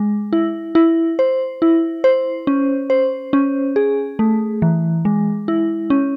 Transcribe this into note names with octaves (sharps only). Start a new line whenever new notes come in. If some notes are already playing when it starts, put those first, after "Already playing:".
Already playing: G#3
E4
E4
C5
E4
C5
C#4
C5
C#4
G#4
A3
E3
G#3
E4
C#4